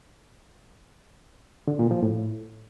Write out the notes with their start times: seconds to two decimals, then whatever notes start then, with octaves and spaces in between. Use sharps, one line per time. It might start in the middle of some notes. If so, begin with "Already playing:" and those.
1.67 D3
1.79 A#2
1.91 F3
2.03 A2